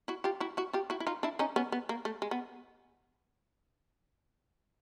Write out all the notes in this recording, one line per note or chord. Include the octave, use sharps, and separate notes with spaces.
E4 F#4
F4 G4
E4 F#4
E4 F#4
F4 G4
E4 F#4
E4
D#4 F4
D4 E4
C#4 D#4
B3 C#4
B3
A#3
A3
G#3
B3